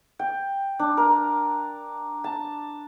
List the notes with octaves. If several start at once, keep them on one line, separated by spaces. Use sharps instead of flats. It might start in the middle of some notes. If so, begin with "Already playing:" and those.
G5
D4
A#4
A5